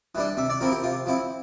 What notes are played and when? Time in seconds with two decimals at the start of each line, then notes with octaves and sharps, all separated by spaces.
0.15 E3 G3 D4
0.37 C3 E5
0.50 D5
0.61 F3 C4 E4 A#4
0.72 G4
0.83 C3 F4
1.06 F3 C4 E4